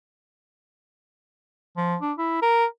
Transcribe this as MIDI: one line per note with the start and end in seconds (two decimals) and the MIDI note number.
1.77 1.96 53
2.01 2.13 62
2.18 2.38 64
2.42 2.65 70